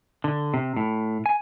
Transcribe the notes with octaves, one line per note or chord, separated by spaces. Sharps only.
D3
C3
A2
G#5